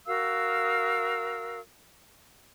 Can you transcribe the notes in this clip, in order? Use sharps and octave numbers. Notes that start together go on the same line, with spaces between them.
F#4 A#4 F5 E6